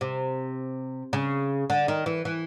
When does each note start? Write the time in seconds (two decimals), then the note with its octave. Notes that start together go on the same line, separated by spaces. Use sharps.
0.01 C3
1.13 C#3
1.70 D3
1.88 D#3
2.06 E3
2.25 E3